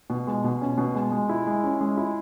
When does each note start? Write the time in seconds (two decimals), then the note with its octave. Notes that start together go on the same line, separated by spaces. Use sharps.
0.10 B2
0.27 G#3
0.44 B2
0.61 C#4
0.78 B2
0.95 G#3
1.12 G#3
1.29 E4
1.47 G#3
1.64 C#4
1.81 G#3
1.97 E4